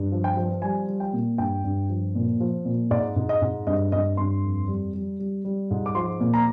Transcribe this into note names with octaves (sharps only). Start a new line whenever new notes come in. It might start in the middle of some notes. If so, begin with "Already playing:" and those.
Already playing: G2
F3
G5
F3
G3 G#5
G3
G5
A#2
G2 G5
G2
F3
A#2
F3
A#2
G#2 D5
G#2
D#5
G#2
G2 D#5
G2 D#5
G2 C6
F2
G3
G3
G3
G3
G#2
D6
F3 C6
A#2
A#5